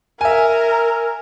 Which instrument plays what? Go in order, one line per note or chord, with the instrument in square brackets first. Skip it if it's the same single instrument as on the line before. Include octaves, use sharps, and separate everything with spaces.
[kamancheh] A#4 [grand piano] E5 G#5